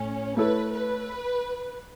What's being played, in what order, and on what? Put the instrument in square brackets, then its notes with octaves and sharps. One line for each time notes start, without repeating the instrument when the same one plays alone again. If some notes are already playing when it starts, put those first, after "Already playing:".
Already playing: [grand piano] A2 A3 [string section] C#4
[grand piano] A3 E4 A4 C#5 [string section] B4
[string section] B4